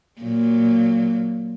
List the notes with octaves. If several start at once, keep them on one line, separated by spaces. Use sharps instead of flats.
A#2 F#3